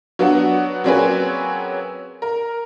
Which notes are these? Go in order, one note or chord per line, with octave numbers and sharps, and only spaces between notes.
F#3 B3 D4 F#4
F#3 A#3 C4 C#4 G#4 B4
A#4